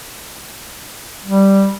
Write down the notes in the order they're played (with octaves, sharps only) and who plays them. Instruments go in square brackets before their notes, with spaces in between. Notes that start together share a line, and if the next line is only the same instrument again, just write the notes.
[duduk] G3